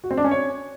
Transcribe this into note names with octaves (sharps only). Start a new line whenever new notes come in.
F#4
C4
D4
C#4
C#5